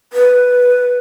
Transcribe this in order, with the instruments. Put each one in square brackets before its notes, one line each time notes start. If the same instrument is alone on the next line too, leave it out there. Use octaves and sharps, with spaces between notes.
[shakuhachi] B4